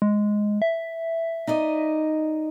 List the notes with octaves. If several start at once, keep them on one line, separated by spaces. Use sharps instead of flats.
G#3
E5
D#4 D5 D#5